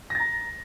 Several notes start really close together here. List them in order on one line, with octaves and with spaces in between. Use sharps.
A#6 A6 A#5